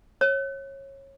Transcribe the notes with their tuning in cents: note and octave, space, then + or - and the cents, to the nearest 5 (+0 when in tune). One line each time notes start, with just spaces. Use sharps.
C#5 -25